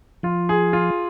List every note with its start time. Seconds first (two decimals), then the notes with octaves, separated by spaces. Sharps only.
0.23 F3 F4
0.49 G#4
0.73 F4